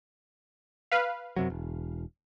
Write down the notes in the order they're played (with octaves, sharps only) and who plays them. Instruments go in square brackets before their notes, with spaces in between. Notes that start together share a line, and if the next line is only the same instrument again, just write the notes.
[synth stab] B4 F5
[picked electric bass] F#2 C3 F#3
E1